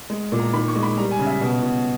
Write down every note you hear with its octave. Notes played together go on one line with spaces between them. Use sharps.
G#3
A#2
A#5
D#3 B5
C#6
G#3
B5
G3 A#5
G#5
C#3
E5
B2
B2